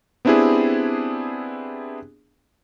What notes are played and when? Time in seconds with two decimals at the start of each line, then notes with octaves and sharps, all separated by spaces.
0.25 B3 C4 D4 E4 G4 G#4